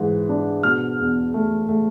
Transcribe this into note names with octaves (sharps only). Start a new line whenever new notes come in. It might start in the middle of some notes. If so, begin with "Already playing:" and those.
Already playing: G#2 E3
D4
B2 F6
E2
A3
A3